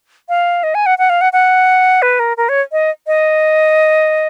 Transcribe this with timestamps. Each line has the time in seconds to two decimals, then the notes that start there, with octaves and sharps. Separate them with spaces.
0.29 F5
0.63 D#5
0.75 G#5
0.86 F#5
0.98 F#5
1.10 F5
1.21 F#5
1.33 F#5
2.02 B4
2.20 A#4
2.37 A#4
2.49 C#5
2.72 D#5
3.07 D#5